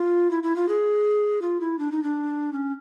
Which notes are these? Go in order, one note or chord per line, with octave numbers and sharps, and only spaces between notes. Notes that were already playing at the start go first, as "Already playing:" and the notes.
Already playing: F4
E4
E4
F4
G#4
F4
E4
D4
D#4
D4
C#4